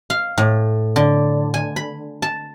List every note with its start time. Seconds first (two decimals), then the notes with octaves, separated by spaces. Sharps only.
0.10 F5
0.38 A2
0.96 D3
1.54 G#5
1.76 B5
2.22 A5